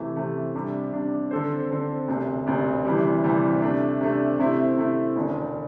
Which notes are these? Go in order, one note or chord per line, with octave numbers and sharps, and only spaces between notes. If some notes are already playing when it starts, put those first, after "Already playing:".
Already playing: C3 E3 A3
C3 E3 A3
C3 G3 D4
C3 G3 D4
D3 C4 A4 C5
D3 C4 A4 C5
E1 D2 C3
E1 D2 C3
D2 C3 E3 G3
D2 C3 E3 G3
C3 A3 D4
C3 A3 D4
C3 A3 C4 E4
C3 A3 C4 E4
E1 D2 D3